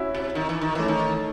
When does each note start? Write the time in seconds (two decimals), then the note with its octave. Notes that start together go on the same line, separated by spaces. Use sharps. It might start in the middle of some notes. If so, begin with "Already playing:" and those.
Already playing: C#4 E4 F#4
0.15 C3
0.35 D#3
0.49 E3
0.61 D#3
0.75 E3 A3 C#4
0.88 D#3